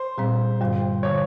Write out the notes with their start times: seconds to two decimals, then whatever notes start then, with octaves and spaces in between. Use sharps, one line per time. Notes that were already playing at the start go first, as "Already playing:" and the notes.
Already playing: C5
0.18 A#2 G3 C4
0.61 G2 D3 G3
1.03 D3 G3 C#5